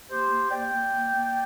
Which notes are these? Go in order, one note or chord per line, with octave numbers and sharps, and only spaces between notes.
A#3 G4 C5
A#3
A#3 D5 G5
A#3
A#3
A#3